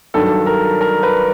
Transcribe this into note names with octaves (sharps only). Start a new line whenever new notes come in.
G2 D#3 F#3 A4
A#4
A#4
B4